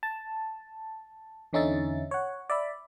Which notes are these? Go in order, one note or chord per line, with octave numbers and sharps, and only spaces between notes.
A5
E2 D3 C#4 D#4 E5 A6
C#5 F#5
D5 E5 B5